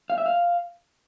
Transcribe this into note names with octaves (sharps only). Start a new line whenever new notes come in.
F5
E5
F5